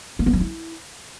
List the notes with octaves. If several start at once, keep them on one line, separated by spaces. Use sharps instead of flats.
A#3
B3
F3
E4